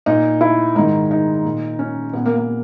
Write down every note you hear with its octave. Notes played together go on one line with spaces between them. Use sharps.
A#2 D#4
E4
G#2 D#3 D#4
D#4
A#2
C#4
A#2 B3
A#3
A#3